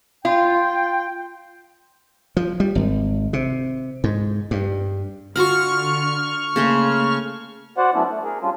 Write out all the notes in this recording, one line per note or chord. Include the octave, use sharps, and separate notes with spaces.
F4 G5
F3
G3
G#1
C3
G#2
G2
D3 F4 F#4 F#5 C#6 F6
C#3 A3 A#3 C6
F#4 C5 D5 F#5
F#3 A3 B3 C#4 D4 E4
A3
G#4 A#4
G3 C#4 D4 F4